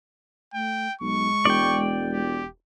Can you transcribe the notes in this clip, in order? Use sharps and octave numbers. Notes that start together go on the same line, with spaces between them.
A3 G5
B1 G#3 C#6
E1 D5 G5
G4